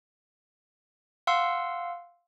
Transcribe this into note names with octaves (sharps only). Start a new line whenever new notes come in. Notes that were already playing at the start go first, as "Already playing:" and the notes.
F5 F#5 C6 E6